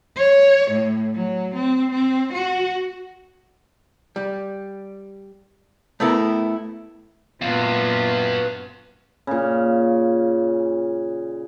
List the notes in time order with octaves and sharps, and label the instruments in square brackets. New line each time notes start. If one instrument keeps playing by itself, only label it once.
[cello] C#5
A2
F#3
C4
C4
F#4
[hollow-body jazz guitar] G3
A3 B3 E4 A4 A#4
[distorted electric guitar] F#2 [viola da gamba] A#2 B3 F4 [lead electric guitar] B4 F5
[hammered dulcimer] A#2 C#3